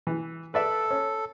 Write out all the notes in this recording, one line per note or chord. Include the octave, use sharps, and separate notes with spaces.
E3
A4 B4 D5 E5
C#4